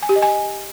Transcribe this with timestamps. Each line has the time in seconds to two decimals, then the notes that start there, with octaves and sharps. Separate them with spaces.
0.03 G#5
0.09 G4
0.16 D#5
0.22 G#5